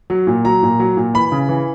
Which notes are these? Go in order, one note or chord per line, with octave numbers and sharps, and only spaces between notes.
F#3
A#2
F#3 A#5
A#2
F#3
A#2
E3 B5
C#3
E3